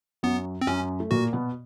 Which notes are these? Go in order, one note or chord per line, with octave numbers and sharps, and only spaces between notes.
F#2 F#3 B3
C4
F#2 F#3 C#4
A3
A#2 A#3 F#4
B2 B3